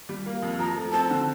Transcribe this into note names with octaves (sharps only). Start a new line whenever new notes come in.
G3
A#3
F2
F3 A#5
A3
C4 A5
D3